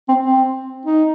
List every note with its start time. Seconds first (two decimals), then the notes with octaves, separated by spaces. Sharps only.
0.08 C4
0.24 C4
0.85 D#4